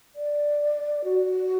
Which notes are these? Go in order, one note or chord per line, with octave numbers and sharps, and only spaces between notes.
D5
F#4